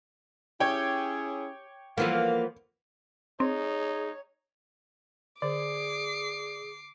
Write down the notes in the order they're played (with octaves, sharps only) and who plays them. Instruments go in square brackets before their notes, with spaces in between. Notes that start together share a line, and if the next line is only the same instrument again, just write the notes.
[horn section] C#4 E4 G#4 [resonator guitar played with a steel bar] G4 [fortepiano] C#5 G5
[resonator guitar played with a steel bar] E3 F3 B3 [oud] A#3 A4 [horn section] F5
[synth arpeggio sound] C4 [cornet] D#4 [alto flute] G#4 [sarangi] C#5
[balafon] D3 C5 [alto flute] G#4 [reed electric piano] D5 [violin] D6 C7